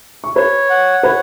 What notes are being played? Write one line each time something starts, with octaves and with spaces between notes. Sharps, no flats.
C#6
B4 C#5 B5
F#5
B4 C#5 B5